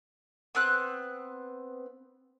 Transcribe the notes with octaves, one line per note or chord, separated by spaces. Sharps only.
B3 C4 F#6